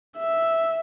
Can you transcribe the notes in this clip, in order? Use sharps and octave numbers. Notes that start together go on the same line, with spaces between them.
E5